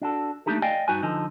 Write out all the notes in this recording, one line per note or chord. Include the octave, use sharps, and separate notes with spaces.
D4 F#4 A4
A3 A#3 D4 D#4 G4 A4
D5 D#5 F5 G5 G#5
G2 D#4 F#4 B4 G#5
D3 F3 D#4 A4